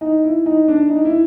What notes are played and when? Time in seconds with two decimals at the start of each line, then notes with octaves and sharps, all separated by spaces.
0.01 D#4
0.24 E4
0.46 D#4
0.68 D4
0.90 D#4
1.05 E4